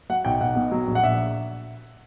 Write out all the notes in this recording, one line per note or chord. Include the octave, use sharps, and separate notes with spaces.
F#3 F#5
B1 G5
B1 F#5
B2
F#3
A#1
F#5
A#1 E5